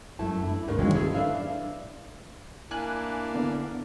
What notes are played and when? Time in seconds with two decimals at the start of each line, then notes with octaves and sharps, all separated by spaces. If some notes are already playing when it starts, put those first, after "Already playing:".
0.19 F#2 A3 E4 A5
0.44 D4 E4
0.67 D2 G#2 A3 B3 D4 A#4
0.79 D#3 F#3 G#3 A#3 C4 C#4
0.94 C#4 E4 G#4 A4 B4
1.14 D4 B4 D5 E5 F5
2.71 A#3 D4 E4 G#5 F#6
3.34 D3 B3